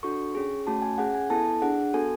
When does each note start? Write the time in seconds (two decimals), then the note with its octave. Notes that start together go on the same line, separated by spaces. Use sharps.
0.03 D4 F#4 A4 C#6
0.35 C#4 G#4
0.67 A3 C#4 F#4 A5
0.82 G#5
0.98 C#4 G#4 F#5
1.15 G#5
1.30 B3 E4 A4 A5
1.62 D4 G#4 F#5
1.93 B3 F#4 A4 G#5